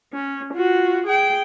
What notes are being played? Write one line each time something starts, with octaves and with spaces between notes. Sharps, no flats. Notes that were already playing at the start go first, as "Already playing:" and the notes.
C#4
F4 F#4
G#4 G5